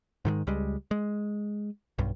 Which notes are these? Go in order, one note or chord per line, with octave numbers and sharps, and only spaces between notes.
G#2 D#3 F3 G#3
C#2 G3 G#3
G#3
B1 G2